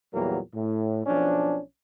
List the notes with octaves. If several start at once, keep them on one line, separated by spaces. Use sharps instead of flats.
E2 A#2 F#3 G3 A#3 A#4
A2
B1 F3 C#4 D4